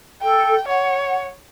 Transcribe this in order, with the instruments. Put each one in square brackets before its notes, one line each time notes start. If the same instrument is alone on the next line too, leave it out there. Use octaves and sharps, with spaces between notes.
[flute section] A4 [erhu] G5
[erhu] C#5 [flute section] F#5